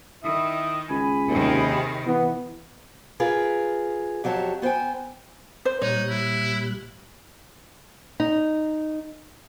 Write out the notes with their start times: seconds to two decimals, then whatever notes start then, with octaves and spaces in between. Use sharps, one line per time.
0.23 D#3 E4 E5 D#6
0.90 C#2 G#4 G#5 B5
1.28 D#2 C3 D#3
2.07 E3 B3
3.20 F4 G#4 A#4 B4
4.24 F2 F#3 G4 C#5 A5
4.62 B3 C5 F5 G5 G#5
5.65 C5
5.82 A#2 G3 D#4 C#5 F#6
6.09 E4
8.20 D#4